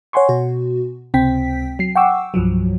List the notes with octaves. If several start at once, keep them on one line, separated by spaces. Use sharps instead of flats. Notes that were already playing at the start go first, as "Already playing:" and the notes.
C#5 F#5 G#5 C6 C#6
B2 F#4
C#2 C3 C4 G5 B6
F#3 C7
F#5 G5 C#6 D6 E6
C2 G2 F3 F#3